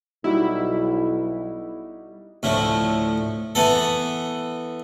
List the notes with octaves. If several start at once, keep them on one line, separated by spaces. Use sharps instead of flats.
B1 G3 D#4 E4 F#4
D2 A2 F3
E3 B3 A4